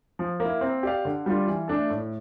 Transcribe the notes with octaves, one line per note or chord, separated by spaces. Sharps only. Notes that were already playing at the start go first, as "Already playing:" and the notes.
F3
A#3
E4
C4
G4 D5 F5
D3
G3 D4 F4
E3
A3 D4 A4
A2